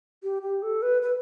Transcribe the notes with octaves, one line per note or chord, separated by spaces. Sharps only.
G4
G4
A4
B4
B4